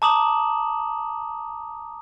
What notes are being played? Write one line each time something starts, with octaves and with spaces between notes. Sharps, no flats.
A5 A#5 D6 D#6 E7 F#7